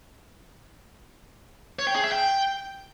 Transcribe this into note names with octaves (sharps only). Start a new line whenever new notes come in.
C#5
G5
G#4
E5
G5